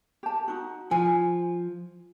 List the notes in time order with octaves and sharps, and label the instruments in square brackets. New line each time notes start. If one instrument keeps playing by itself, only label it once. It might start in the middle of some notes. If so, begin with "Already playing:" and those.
[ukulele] G4 A5
D#4 F#4
[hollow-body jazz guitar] F3 [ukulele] G#5